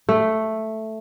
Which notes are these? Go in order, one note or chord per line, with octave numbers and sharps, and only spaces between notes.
A3